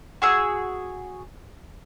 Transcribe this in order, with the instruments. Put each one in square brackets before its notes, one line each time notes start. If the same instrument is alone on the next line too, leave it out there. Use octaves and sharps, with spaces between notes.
[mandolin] F#4 G#4 E6